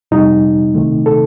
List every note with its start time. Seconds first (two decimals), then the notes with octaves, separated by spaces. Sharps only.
0.11 F2 C3 G3 D#4
0.75 C2 C3 D#3 A3
1.06 A4